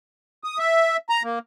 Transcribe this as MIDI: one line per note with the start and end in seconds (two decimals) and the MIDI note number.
0.44 0.58 87
0.59 0.97 76
1.09 1.23 82
1.23 1.39 58